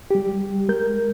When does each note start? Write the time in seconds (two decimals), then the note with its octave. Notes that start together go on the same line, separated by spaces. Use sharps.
0.11 G3 G4
0.69 G#3 A#4 G6